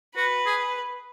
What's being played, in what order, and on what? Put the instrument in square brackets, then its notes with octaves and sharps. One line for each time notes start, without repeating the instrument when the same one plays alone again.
[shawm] F#4 [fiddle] B4
[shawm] G#4